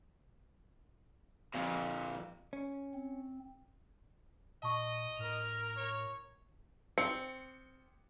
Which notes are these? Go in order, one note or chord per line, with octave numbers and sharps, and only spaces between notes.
F2 A#2
C#4
C4
A#2 D#5 A5 C#6
A2 A#4 F6
C#5
C4 C#7